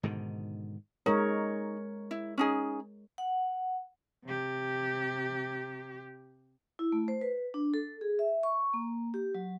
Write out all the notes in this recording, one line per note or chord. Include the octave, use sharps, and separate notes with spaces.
G#2 B2 D3 D#3
G#3 D#4 A#4 C#5
E4
C#4 D#4 G#4
F#5
C3 G4
E4
A3
C5
B4
D4
A4
G#4
E5
C#6
A#3
G4
F#3